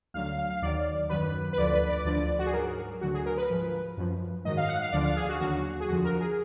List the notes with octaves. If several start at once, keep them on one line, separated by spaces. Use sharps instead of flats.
D2 D3 F#3 F5
F5
F5
F5
D#2 D#3 F#3 D5
F#2 D#3 F#3 B4
B4
D2 D3 F3 D5
B4
D5
D2 D3 F3 D5
F#4
G#4
G#2 F#3 A#4
D2 D3 F#3 F#4
G#4
A#4
B4
G#2 F3
F#2 F3
G#2 D#3 F#3 D#5
F5
F#5
F5
D2 D3 F3 D5
F5
G#4
F#4
D#2 D3 F#3 F#4
G#4
F2 D3 F3 F#4
A#4
G#4